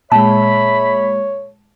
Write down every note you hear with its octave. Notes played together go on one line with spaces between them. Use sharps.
A#2 G#3 C#5 E5 A5 B5